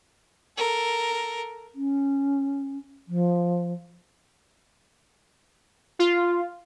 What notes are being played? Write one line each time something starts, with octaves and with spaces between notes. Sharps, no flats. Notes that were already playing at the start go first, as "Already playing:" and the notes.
A4 A#4
C#4
F3
F4